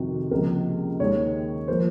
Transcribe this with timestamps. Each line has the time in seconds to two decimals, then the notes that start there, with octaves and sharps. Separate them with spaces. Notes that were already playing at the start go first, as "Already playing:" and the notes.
Already playing: F2 C3 D#3 F#4
0.31 C#2 C3 F3 A#3 A#4
1.00 D#2 D#3 G#3 C#5
1.68 F3 A#3 C5